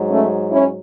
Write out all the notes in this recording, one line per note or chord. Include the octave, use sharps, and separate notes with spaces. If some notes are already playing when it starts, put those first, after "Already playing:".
Already playing: G#2 F#3
A3 C#4
C#4 E4